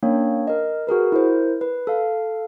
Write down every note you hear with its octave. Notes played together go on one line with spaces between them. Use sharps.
A#3 C#4 D4 C#5 G5
A#4 D#5
F#4 G#4 A#4 B4
E4 A#4 C5
B4
A4 F5